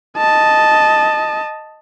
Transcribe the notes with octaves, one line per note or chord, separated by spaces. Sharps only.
D#5 A5